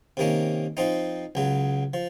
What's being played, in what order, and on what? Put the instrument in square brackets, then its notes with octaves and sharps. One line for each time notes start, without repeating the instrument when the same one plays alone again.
[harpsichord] C3 D#3 A#3 C#4
F3 C4 D#4
C#2 C#3 F#3
F3